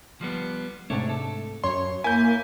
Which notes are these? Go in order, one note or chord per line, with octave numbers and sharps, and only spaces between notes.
F3 G3 B3
G#2 C3 A3 D4 C#5
A4
F#2 C#5 C6
A#3 E4 G#5 G6